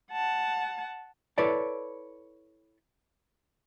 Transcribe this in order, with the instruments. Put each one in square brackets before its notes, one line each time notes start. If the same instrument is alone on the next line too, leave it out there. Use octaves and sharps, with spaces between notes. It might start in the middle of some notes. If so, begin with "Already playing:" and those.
[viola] F#5 A5
[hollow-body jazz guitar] E4 A4 B4 C#5 D5 A5